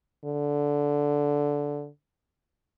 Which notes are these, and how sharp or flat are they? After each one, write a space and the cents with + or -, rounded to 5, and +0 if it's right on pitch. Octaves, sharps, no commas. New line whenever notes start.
D3 -10